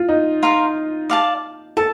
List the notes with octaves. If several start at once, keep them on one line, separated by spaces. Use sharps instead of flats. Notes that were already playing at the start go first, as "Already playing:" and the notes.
Already playing: F4
D#4
F4 A#4 F5
D5 F5 A5
A4 A5